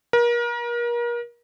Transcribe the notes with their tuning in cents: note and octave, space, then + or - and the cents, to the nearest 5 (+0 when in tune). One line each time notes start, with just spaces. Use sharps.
A#4 +35